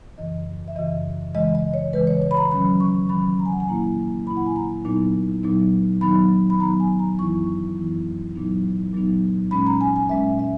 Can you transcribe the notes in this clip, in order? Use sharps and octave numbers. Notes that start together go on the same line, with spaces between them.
F#2 C#3 E3 D#5
E5
F#2 C#3 E3 D#5
C#3 E3 G#3 D#5
D#5
C#5
C#3 E3 G#3 B4
C#5
C#5
B5
A#5
D#3 F#3 C#4 B5
C#6
D#3 F#3 C#4 B5
A#5
G#5
F#5
G#5
A#2 A#3 E4 A#5
A#2 A#3 E4 B5
F#5
G#5
A#5
A#2 F#3 B3 D#4
A#2 F#3 B3 D#4
D#3 F#3 B3 D#4 B5
B5
D#3 F#3 B3 D#4 A#5
G#5
A#5
F#2 E3 B3 E4 C#6
F#2 E3 B3 E4
A#2 F#3 B3 D#4
A#2 F#3 B3 D#4
A#2 G#3 C#4 B5
A#5
G#5
G#5
A#2 G#3 C#4 E5
E5